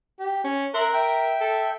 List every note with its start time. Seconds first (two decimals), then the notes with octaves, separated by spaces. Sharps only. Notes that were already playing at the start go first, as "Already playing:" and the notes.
0.20 G4
0.44 C#4
0.74 A#4 E5 C6 F#6
0.93 E5 G5
1.40 A4